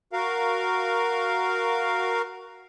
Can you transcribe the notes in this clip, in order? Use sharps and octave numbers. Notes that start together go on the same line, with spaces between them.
F#4 A#4 F5